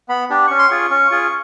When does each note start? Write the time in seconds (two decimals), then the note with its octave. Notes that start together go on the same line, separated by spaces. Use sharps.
0.09 B3 B5
0.30 D4 G4
0.47 C#4 C#6
0.59 C6
0.69 F4 G#4 C#6
0.91 C#4
1.11 F4 G#4